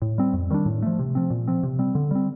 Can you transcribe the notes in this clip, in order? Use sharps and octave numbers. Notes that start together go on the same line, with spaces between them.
A2
G3 C4
F2
D#3 G3 D4
A2
F3 A3
C3
F3 C4
A#2
F3 C4
C3
G3 C4
D3
G3 C4